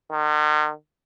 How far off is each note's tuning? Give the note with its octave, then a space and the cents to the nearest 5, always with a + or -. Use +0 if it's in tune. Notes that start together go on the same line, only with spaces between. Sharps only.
D#3 -45